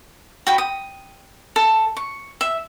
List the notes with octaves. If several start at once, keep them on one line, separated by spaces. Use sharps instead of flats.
F#4 G5 B5
D#6
A4
C#6
E5